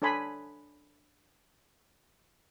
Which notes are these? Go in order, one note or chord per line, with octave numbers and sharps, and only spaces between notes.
D4 A4 C#5 G#5 B5 C6